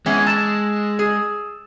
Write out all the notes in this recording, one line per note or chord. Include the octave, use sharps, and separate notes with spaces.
E3 G#3 B3 C#4
A5 E6 A6 E7
G#4